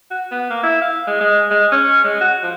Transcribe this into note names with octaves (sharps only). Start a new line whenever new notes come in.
F#4
B3
A#3
E4
F5
G#3
G#3
G#3
C#4
G#3
F#4
F3